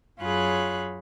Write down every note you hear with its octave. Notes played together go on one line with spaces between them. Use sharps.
F#2 F4 G#4 C#5 B5 F#6